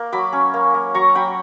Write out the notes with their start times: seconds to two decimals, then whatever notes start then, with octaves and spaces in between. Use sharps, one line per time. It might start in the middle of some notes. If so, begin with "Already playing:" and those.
Already playing: A#3
0.12 F#3 B5 D6
0.33 C#4
0.54 A#3
0.74 A#3
0.94 F#3 A#5 C#6
1.15 F#3 G5 B5